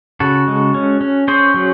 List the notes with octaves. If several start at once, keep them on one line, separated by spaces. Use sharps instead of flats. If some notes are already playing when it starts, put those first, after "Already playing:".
C#3 F#4 A4
G#3
C#4
C#4
C#4 G#4 C5
F#3